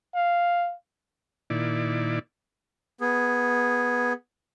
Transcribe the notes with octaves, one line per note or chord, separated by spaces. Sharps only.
F5
A#2 D#3 E4 D5
B3 G#4